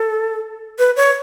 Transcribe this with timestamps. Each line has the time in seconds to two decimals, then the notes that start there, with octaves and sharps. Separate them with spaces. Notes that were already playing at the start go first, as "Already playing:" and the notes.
Already playing: A4
0.79 B4
0.96 C#5